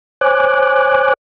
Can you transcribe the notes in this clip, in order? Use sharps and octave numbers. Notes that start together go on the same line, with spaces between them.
C5 C#5 G#5 D6 F#6